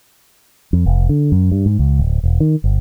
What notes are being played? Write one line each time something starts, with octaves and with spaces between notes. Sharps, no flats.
F2
F1
D3
F#2
G2
G#2
C#2
D1
E1
D#3
G1